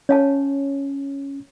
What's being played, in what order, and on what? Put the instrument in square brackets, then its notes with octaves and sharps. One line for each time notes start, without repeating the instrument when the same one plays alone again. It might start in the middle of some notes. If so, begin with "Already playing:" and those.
[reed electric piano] C#4 [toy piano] C#5 F5 A5